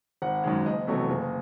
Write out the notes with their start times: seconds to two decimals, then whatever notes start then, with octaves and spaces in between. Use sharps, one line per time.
0.22 G#1 F#5
0.44 F#2 D#3 G#3
0.66 F#1 D#5
0.87 E2 C3 F#3 A3
1.09 F#1